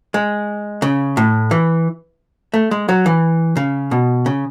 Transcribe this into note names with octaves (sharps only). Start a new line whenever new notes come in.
G#3
C#3
A2
E3
A3
G#3
F#3
E3
C#3
B2
C#3